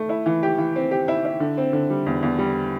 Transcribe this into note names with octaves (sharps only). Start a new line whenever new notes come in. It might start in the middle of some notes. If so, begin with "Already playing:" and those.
Already playing: A3
E4
E3
G4
E3
C4
G4
E4
E4
D3
C4
D3
G3
E2
E2
G3